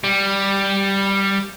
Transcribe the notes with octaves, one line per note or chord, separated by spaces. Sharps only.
G3